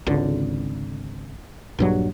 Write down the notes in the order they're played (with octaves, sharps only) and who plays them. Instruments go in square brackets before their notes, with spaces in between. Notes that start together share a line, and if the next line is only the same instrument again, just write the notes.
[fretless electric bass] G#1 C#2 D3
A#1 G2 F#3